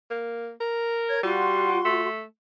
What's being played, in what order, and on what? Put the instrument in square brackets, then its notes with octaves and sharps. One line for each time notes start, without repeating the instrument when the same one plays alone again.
[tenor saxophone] A#3
A#4
[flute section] C#5 G#6
[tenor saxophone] G3 [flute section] F4 F#4 C6
[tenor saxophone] A3